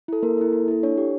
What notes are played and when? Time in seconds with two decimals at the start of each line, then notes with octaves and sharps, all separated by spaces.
0.08 E4 A4
0.23 A#3 A#4
0.38 E4 A4
0.53 A#3
0.68 E4 A4
0.83 D4 C#5
0.98 G4